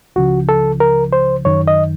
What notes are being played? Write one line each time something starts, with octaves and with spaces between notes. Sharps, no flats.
C#2 C#3 F3 F#4
A4
A#4
C5
F#2 D#3 C#5
D#5